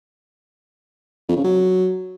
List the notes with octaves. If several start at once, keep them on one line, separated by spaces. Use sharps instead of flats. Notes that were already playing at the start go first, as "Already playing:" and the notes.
F2
C#3
F#3